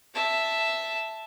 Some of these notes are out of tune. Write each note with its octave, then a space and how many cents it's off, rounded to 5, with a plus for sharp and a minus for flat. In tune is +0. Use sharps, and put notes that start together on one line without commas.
E5 +0 A5 +0